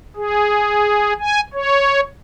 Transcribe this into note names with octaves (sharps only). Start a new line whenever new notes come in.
G#4
G#5
C#5